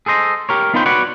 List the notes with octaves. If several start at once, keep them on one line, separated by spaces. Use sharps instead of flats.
G#4 A4 C5 D#5
G4 A#4 C#5
B3 D#4 F4 B4 C5 G5
F#4 B4 C#5 D5 F#5